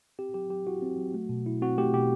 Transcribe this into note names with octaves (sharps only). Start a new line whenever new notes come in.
C4 G4
F#3 G4
F#3 G4
E4 F#4
C4
F#3
A3
B2
E4
C4 F#4
A3 G4
B2 G4